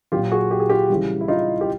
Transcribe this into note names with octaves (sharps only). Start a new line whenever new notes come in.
A#2 F#3 F4 G4
F#4 G#4
G4
G#4
F4 G4
C#3 E3 G3
E4
D#4 F4
G4